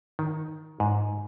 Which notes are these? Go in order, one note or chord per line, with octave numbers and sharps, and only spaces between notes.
D#3
G#2